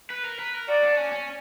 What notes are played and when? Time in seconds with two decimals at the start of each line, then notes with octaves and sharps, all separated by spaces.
0.10 B4
0.25 A#4
0.39 B4
0.54 A#4
0.68 F#4 D5
0.83 D4
0.97 C#4
1.12 C#4